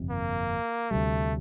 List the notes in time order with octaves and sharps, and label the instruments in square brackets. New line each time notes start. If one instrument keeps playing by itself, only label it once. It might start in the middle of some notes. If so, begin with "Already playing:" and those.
Already playing: [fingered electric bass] G1 F2 C3
[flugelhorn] A#3
[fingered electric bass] D2 C3 G3 [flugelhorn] A3